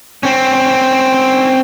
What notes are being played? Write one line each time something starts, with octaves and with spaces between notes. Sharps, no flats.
C4 C#4